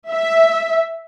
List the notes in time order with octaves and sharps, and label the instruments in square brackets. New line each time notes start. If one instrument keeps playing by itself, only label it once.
[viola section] E5